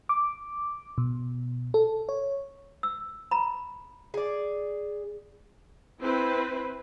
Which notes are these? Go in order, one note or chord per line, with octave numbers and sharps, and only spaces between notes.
D6
B2
A4
C#5
E6
A#5 B5
G#4 D5
C4 E4 B4 C5